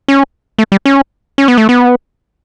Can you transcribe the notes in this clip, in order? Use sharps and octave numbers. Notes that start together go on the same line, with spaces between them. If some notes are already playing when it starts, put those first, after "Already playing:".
C#4
A3
G3
C#4
C#4
B3
A3
B3